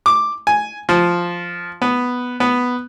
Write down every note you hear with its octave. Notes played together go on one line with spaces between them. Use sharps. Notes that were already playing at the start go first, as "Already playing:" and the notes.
D6
G#5
F3
B3
B3